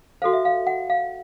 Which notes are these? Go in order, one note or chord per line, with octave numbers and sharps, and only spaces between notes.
F#4 A4 C5 F5
E5
F5
F#5
F5